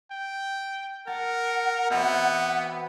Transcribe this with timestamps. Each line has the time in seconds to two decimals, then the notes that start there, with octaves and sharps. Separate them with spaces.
0.11 G5
1.07 A#4 F#5 A5
1.90 B2 E3 B3 C4